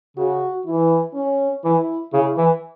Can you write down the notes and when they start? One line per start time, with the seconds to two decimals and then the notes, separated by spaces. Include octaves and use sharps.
0.17 C#3 F#4
0.66 E3 E4
1.14 C#4
1.64 E3 E4
2.13 C#3 E4
2.37 E3